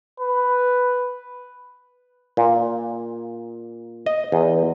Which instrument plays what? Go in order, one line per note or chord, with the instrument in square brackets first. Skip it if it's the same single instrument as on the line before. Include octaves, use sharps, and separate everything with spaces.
[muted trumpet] B4
[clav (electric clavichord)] A#2
D#5
E2